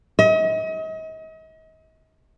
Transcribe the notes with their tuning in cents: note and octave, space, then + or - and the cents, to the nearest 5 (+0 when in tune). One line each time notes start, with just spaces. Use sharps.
D#5 +40